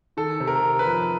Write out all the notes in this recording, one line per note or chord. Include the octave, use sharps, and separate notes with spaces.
D#3 A4
C3
A#4
C3
B4
F2